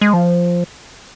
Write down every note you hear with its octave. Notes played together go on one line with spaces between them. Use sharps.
G#3
F3